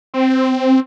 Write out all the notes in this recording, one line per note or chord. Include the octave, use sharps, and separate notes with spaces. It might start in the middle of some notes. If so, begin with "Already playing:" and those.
C4